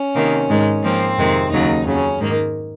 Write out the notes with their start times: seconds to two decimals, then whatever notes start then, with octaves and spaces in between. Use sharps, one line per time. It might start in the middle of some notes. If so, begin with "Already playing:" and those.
Already playing: C#4
0.15 C3 D#3 A#3
0.49 G#2 D#3 G#3
0.83 G#2 F3 A#3 C4
1.18 F2 C3 D#3 G#3
1.51 D#2 C#3 F#3 A#3 D#4
1.86 F2 C#3 F#3 C#4
2.20 G#2 D#3 A#3